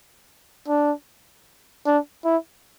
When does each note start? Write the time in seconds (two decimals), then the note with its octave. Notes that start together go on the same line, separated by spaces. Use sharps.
0.68 D4
1.86 D4
2.25 E4